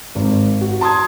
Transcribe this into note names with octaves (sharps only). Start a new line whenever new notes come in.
G#1
F#4
A5 C6 D#6 G#6